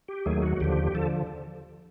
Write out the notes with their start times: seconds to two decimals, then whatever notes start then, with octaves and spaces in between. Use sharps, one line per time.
0.08 G4
0.26 D#2 D#3 F#3 A3 G#4
0.43 F#4
0.60 D#2 D3 F3 G4
0.95 D3 F3 A4